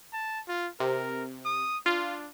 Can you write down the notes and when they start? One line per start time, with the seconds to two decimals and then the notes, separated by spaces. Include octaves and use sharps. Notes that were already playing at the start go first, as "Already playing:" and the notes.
0.13 A5
0.48 F4
0.80 C3 A#4
1.45 D#6
1.86 D4 F4